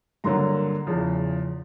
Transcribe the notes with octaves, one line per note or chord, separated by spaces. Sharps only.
G2 D3 F#3 A#3 A#5 C6
E2 C#3 F3